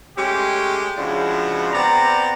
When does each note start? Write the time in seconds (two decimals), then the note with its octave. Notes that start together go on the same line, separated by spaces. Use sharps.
0.18 G#3 A3 C#4 G4
0.98 C#3 F3 G#3 D4 E4 F#4
1.74 B3 C4 D5 A#5